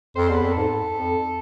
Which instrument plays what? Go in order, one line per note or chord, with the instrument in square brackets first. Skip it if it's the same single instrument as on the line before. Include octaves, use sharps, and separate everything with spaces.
[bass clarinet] F2 [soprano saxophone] C5
[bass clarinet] E2 [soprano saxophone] C5
[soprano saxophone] B4
[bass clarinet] F2
[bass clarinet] G#2 [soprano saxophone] A4
[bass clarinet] F2